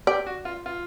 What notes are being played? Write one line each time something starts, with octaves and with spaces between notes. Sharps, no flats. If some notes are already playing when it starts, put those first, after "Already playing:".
G4 D5
F#4
F4
F4